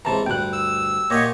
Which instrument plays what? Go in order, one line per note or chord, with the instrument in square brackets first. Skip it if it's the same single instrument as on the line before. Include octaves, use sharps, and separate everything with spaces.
[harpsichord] C#2 C3 E3 [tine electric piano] A5 A#5
[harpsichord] D2 G2 [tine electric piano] G5 F#6
[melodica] E6
[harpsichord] A#2 F#5 G#5 [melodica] G4 C#5 D#5